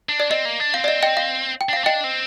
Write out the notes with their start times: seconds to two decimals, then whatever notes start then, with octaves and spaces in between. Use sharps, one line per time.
0.09 D4
0.20 D5
0.31 C4 D#5
0.45 A#3
0.60 D4
0.74 C4 F5
0.84 D5
0.88 D#5
1.02 D#5 G5
1.17 F5
1.61 G5
1.69 D4
1.73 C4 F5
1.84 D4 D#5 G5
2.04 C4